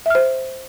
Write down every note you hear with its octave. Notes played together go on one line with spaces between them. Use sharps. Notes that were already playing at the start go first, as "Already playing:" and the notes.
C5 E5 F6